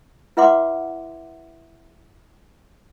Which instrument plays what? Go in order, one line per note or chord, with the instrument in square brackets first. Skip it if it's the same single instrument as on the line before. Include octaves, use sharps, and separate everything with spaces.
[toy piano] E4 B4 E5 F#5 C6 D6